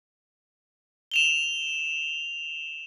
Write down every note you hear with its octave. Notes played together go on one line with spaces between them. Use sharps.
E7 F7 G7